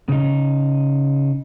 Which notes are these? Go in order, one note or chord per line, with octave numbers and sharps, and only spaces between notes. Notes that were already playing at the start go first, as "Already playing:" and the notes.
C#3 D#4